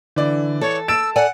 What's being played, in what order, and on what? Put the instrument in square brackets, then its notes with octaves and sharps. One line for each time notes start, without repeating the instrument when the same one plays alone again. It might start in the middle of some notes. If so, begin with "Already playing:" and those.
[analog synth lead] D3 [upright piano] E3 D5
[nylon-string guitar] A4 [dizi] C#5 [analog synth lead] A5
[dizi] E6 [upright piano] A6 D7 E7
[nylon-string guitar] A4 D5 G#5 [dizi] F#5